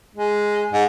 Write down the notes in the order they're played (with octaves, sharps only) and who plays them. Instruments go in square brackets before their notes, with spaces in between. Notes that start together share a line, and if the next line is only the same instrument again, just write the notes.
[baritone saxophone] G#3
G#2